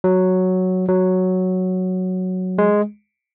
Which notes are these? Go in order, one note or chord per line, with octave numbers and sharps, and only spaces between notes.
F#3
F#3
G#3